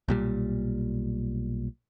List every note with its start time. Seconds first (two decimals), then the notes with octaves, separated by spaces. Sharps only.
0.08 B1 A#2 G3